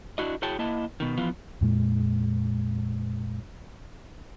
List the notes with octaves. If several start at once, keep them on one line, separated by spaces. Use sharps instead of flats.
D4 E4 F#4 D#5
E4 F#4 G#4 C#5 G5 A5
A#3 E4 D#5 A5
B2 D#3
E3 F3 B3 F4
F2 A#2 G#3